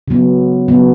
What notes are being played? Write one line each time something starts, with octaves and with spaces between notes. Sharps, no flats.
C#3 F#3 B3
C#3 F#3 B3